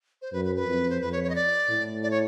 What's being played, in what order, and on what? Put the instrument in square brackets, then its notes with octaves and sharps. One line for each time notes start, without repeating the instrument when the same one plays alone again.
[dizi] C5
[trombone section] F#2 [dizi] B4
[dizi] B4
B4
[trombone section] F2
[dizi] C5
[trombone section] F2 [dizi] B4
[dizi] C#5
C#5
D#5
D5
[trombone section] A2
[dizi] D5
C#5